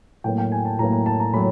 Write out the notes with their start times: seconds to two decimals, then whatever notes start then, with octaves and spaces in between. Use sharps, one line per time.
0.24 A2 F#3 A#3 G5
0.38 G5
0.52 G#5
0.65 A5
0.79 A2 F#3 A#3 A#5
0.93 A#5
1.06 A5
1.20 A#5
1.33 A2 F#3 B5